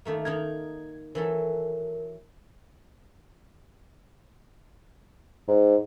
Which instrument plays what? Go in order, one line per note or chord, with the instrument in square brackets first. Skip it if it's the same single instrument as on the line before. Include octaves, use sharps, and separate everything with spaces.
[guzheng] D#3 A3 A#3
[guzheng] D#3 D#4 A#4 [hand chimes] G#6
[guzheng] E3 F#3 A4 [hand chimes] A#4
[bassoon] G#2